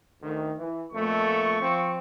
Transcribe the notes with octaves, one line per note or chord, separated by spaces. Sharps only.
D2 D#3
E3
F2 A#2 A3 C#6
F3 C4